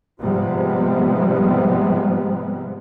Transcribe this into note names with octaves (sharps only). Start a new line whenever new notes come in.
G#2 C3 F3 G3 G#3 B3